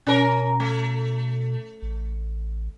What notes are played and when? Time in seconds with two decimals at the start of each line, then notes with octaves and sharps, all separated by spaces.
0.07 B2 C#4 A#4
0.60 A3
1.82 A1